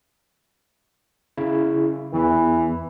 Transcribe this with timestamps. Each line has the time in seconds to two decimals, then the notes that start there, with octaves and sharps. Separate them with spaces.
1.37 C#3 E4
2.13 E2 E3